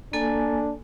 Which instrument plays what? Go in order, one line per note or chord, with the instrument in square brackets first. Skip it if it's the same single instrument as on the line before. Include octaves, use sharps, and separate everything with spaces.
[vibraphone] A#3 A4 G#5 [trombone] D4